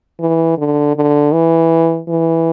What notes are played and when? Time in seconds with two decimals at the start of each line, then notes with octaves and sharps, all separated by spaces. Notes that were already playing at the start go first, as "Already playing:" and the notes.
0.20 E3
0.58 D3
0.96 D3
1.33 E3
2.08 E3